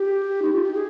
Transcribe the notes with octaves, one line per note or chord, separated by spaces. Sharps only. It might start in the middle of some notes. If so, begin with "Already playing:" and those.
Already playing: G4
D#4
F4
G4
G#4